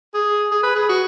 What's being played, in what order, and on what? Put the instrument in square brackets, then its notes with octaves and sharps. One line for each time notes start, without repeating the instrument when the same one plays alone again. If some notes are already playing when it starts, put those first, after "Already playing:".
[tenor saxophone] G#4
G#4
B4
G#4
F#4